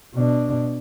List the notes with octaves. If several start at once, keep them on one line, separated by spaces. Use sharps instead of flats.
B2 D4